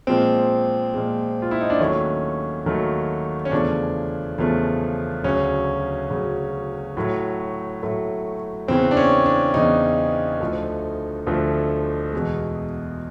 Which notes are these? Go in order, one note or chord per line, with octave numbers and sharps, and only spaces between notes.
A#2 F3 G#3 C4
A#2 F3 G#3
F4
E4
D#4
D4
D#2 D#3 F#3 A3 C#4
D#2 D#3 F#3 A3
C#4
E2 C#3 F3 A3 D4
E2 C#3 F3 A3
D2 C#3 F#3 C#4
D2 C#3 F#3
A2 F#3 A3
A2 F#3 A3
E2 C#3 E3 C4
D4
C#4
D4
E2 C#3 E3 D#4
D2 D3 F3 A3
D2 D3 F3 A3
E2 B2 G#3